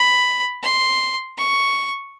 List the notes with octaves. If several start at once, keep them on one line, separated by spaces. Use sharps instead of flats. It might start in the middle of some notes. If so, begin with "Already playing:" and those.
Already playing: B5
C6
C#6